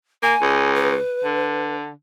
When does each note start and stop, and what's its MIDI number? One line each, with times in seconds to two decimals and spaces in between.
0.23 0.34 58
0.23 0.73 80
0.42 0.96 37
0.75 1.75 71
1.24 1.91 50